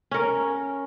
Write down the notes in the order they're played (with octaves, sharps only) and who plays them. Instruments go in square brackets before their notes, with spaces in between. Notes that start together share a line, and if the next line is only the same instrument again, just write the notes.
[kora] C#4 A#4